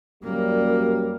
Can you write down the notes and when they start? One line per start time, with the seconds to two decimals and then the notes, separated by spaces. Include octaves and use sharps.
0.23 F#2 G3 A#3